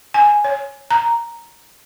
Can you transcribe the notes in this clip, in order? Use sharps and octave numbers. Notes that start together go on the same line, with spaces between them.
G#5
C#5
A#5